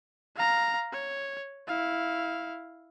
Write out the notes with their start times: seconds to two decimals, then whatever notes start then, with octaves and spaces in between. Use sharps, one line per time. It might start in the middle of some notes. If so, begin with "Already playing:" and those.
0.36 F5 A#5
0.92 C#5
1.67 E4 F5